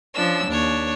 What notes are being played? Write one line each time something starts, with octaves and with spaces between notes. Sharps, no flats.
F3 C#4 D4 E6
D#2 D4 C#5